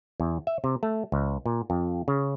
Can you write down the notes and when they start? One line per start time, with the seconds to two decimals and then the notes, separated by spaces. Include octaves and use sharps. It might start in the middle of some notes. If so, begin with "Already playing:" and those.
0.20 E2
0.47 E5
0.64 C3
0.83 A3
1.12 C#2
1.46 A#2
1.70 F2
2.08 C#3